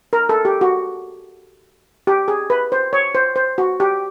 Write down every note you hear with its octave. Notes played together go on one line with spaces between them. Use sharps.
A#4
A4
G4
F#4
G4
G#4
B4
C5
C#5
C5
C5
F#4
G4